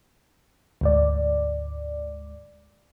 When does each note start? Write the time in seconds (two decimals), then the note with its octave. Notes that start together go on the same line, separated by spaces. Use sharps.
0.81 D2 G#2 D5